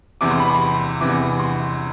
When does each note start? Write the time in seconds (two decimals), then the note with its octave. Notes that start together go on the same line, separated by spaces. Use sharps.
0.21 E2 C3 E3 D6
0.31 C6
0.39 B5
0.50 C6
1.01 E2 C3 E3 D6
1.40 C6